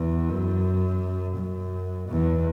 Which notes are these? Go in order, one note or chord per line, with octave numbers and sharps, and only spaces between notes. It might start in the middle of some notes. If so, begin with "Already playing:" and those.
Already playing: E2
F#2
F#2
E2